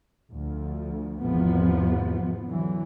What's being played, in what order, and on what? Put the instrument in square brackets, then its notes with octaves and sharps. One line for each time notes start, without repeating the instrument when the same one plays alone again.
[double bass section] D2 F3
G#1 E2 C3 F3 B3
D3 E3 F#3